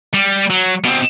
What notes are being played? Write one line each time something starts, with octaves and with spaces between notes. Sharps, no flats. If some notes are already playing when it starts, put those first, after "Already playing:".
G3
F#3
B2 C4